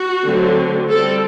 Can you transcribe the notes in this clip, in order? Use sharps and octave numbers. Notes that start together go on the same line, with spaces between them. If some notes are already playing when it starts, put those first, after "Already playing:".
Already playing: F#4
D3 F#3 A3 C4
G3 C4 A4